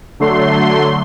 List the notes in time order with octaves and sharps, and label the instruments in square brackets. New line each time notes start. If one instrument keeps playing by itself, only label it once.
[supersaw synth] D3 F#3 A3 C6